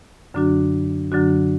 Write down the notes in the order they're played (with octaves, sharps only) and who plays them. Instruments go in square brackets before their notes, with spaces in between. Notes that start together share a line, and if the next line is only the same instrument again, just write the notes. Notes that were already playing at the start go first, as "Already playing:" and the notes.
[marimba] F#2 D3 F#3 D4 F#4
F#2 D3 F#3 D4 F#4